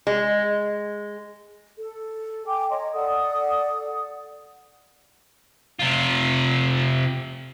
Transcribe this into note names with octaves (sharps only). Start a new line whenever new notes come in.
G#3
A4
G5 G#5 D6
C#5 D#5 A#5 C6
A4 D5 F#5 D#6
C3 F4